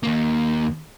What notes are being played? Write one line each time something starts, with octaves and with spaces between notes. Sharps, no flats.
D#2 A#3